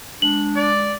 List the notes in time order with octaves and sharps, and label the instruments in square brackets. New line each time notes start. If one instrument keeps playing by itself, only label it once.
[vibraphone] G#3 [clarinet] D4 [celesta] F#7
[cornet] D5